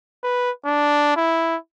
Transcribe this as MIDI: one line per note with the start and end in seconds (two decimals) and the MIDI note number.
0.23 0.51 71
0.65 1.15 62
1.16 1.56 64